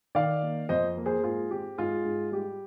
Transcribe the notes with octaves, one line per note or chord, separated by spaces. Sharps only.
D#3 D5 F5
A#3
F2 C5 D#5
A#3
G#4 C5
G#2 F4 G#4
C4 G4
G#2 F4 G#4
G#2
G3 G4